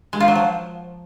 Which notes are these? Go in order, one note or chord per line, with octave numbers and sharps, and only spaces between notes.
G#3
F4
F#3
F3